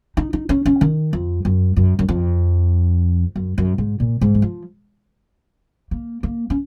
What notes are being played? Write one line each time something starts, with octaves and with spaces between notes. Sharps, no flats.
D#4
D#4
C#4
C#4
D#3
F2
F#2
F#2
F#2
F2
F#2
F#2
G#2
A#2
G#2
D#3
F3
A#3
A#3
C#4